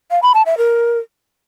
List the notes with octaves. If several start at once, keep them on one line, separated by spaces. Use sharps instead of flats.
F5
B5
A5
E5
A#4